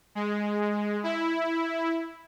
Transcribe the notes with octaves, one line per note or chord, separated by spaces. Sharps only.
G#3
E4